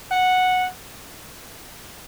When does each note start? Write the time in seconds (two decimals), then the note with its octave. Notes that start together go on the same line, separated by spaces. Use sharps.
0.12 F#5